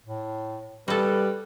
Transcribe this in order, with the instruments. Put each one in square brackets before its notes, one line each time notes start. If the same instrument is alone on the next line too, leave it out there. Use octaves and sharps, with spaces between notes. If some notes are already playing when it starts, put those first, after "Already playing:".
[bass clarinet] A2
[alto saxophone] G3 [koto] F#4 A4 [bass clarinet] B4